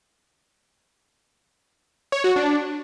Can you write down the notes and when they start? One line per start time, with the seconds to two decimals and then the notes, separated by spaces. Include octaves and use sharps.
2.12 C#5
2.24 F#4
2.36 D4